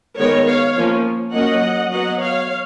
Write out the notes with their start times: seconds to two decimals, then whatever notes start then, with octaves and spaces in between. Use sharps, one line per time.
0.19 D#3 G#3 B3 A#4 C#5
0.47 C#5 F5
0.77 F3 A#3 C#4
1.34 F#3 A#3 C#4 D#5 F#5
1.91 F#3 B3 D#5 F#5
2.21 C#5 F5